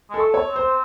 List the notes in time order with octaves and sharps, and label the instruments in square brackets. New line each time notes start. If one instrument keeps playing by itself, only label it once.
[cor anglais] G#3 [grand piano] A4
[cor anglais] A3
[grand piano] C#5
[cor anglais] C4
[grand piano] C5